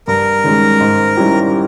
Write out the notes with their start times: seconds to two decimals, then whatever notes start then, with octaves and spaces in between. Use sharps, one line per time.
0.08 G2 A#4
0.44 D#3 G#3 C#4
0.80 G#2
1.17 G3 C#4 E4 G4